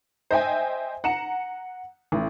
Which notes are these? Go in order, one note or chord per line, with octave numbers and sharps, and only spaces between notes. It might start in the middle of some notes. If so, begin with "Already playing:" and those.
C5 D#5 E5 G5 G#5
F#5 A#5 C#7 E7
A1